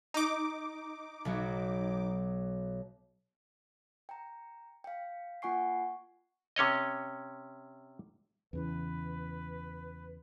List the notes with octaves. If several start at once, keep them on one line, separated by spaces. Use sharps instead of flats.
D#4 D6
B1 F#3 F#4
G5 A#5
F5 G5
A#3 F4 F#5 G#5 C#6 C7
C3 C#4 C#5 D#5
E2 C#3 E3 B4